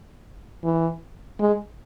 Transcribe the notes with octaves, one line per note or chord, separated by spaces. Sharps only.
E3
G#3